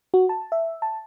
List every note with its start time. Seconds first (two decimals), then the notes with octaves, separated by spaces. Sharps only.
0.14 F#4
0.29 A5
0.52 E5
0.82 A5